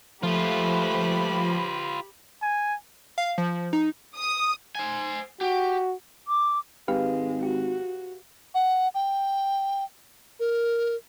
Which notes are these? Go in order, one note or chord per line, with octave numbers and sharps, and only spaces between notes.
F3 A3 F4 G4 B4 B5
G#5
F5
F3
D#4
D#6
C5 G#5
F#4 G4
D6
G#1 G#3 G4 B4 F5
F#4 G4
F#5
G5
A#4